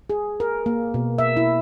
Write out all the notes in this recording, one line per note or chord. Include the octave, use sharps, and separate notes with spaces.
G#4
A#4
A#3
B2
E5
E4